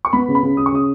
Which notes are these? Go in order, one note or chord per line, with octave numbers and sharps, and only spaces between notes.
C#6
B3 B5
C#3
B5
C#3
C#3 D#6
C#6
C#3 D#6